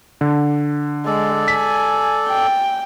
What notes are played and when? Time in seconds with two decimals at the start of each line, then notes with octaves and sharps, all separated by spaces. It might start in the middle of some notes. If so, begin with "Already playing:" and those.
0.21 D3
1.06 G#3 A4 D5
1.48 G#5 B6
2.28 G5